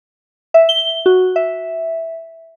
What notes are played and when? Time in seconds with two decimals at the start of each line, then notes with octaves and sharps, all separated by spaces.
0.54 E5
0.69 G7
1.06 F#4
1.36 E5